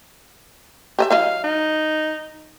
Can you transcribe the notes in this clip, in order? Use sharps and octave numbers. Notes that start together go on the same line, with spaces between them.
G4 D#5 E5
F#3 E4 D#5 F5
D#4